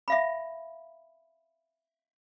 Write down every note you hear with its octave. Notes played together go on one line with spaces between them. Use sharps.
E5 F5 B5